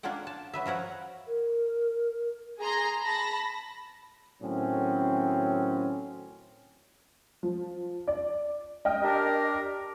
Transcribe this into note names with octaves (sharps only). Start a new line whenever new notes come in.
A#3 D4 F4 C#5 F#5 G5
A5
F#3 B4 E5
F3 A#4 C#5 F#5
A#4
G#4 A#5 C6
A5 B5 A#6
A2 D#3 F#3 C4 C#4
F3
D5
D#5 G5 F6
D4 G4 A#4